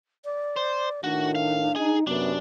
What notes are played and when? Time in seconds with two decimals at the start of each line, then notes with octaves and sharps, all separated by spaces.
0.25 D5
0.56 C5
1.04 A2 D#3 D4 F#4
1.35 F5
1.76 D#4 G#4
2.07 F#2 C3 B3 D4